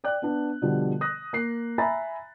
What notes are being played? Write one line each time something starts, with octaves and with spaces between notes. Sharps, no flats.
D5 G5 F#6
B3 D4
B2 D3 F3 G3
D#6 F#6 A#6
A#3 F#6 C7
E5 G#5 A#5 B5 A6